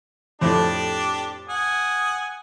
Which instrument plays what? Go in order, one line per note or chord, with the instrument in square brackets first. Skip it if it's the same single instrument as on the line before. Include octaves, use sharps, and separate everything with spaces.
[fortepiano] F2 A2 [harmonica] D4 G4 D5
[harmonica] F#5 G#5 D#6